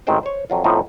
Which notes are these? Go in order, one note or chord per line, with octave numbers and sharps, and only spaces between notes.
A1 D#3 G#3 C4 C5 G5
C5 C#5
F2 F#3 F4
F2 A2 F3 B3 D#4